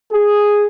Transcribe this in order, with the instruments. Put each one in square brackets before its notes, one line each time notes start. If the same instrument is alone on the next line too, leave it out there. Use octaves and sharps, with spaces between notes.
[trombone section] G#4